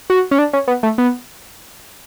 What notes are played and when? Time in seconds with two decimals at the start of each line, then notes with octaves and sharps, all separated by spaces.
0.10 F#4
0.31 C#4
0.39 D4
0.53 C#4
0.68 B3
0.83 A3
0.98 B3